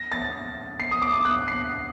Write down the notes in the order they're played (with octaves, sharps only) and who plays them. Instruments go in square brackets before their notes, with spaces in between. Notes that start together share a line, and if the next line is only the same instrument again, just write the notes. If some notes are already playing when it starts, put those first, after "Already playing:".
Already playing: [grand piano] A#6
A6
C7
D#6
D6
D#6
F#6
C7